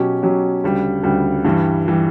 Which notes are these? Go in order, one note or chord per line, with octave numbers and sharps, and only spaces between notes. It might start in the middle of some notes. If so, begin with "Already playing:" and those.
Already playing: B2 F#3 C#4 G4
B2 F#3 C#4 G4
D2 C#3 G3
D2 C#3 G3
G2 E3 G3
E3 G3